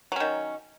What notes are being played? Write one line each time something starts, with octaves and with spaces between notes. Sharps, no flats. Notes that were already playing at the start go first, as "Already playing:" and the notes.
D#3 F#3 C#4